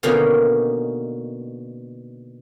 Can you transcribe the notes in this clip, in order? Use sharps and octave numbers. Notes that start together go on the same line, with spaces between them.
B2 D3 D#3 A#3 C#4 D#4